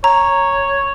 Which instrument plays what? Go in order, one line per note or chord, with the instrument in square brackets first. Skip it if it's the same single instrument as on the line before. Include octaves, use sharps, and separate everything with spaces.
[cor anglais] C#5 [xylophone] A#5